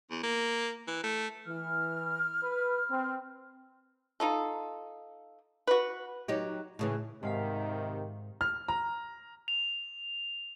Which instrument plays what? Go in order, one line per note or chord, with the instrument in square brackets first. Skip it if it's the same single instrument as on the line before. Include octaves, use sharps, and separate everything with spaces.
[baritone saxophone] E2
A#3
E3
A3
[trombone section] E3 [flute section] F6
[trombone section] B4
C4
[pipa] D#4 F4 A4
F#4 B4
[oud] F#3 D#4 G4
A2 C#3 E3
[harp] G#2 F5 B6 [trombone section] C3 D#3
[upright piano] F6
A#5
[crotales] F7